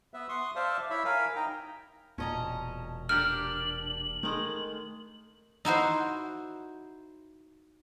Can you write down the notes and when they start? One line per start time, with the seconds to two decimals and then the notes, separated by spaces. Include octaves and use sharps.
0.14 B3 B4 E5
0.29 C6 C#6 D#6
0.55 C5 D5 E5 F5 A5
0.90 E4 C#5 E5 B5
1.05 A#4 F5 G#5 B5
1.36 D#4 G5 A#5
2.18 E1 A#2 C#4 D#5 A5 A#5
3.09 D4 G4 A#4 F6 F#7
4.23 D#3 G#3 A3
5.65 D#4 E4 F#4 C5